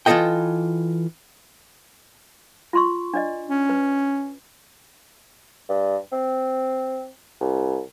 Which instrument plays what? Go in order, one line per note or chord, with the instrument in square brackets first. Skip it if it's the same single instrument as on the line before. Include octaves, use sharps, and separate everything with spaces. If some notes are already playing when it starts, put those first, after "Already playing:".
[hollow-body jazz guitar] E3 F4 F#4 A4 D#5 G5
[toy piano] F4 C6 C#6
D4 D5 D#5
[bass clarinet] C#4
[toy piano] B4
[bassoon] G2
C4
C2